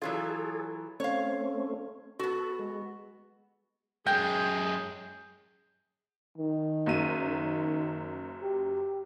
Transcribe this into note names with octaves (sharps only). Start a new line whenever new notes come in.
E3 F#3 F4 G#4 A4
A3 C4 C#4 C#5 F5
B3 F#4 A4
G#3
F#2 G#3 G#4 G5 G6
D#3
F#1 F#2 D#7
D#3
G4